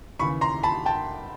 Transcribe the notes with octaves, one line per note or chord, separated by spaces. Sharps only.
D#2 C#3 E3 B5 C#6
A#5 C6
A5 B5
G5 A5